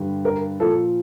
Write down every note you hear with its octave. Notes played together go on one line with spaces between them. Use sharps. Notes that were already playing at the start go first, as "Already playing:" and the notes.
Already playing: G2 D3 G3
A#4
A#2 F3 A4